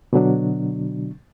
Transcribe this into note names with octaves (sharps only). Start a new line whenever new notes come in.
B2 D3 F#3 D4